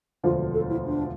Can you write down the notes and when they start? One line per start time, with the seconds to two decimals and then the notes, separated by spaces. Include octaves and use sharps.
0.24 E1 D2 D3 F3 F4
0.54 A4
0.70 E4
0.85 D4